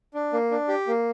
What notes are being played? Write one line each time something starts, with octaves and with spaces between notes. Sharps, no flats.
D4
A#3
D4
G4
A#3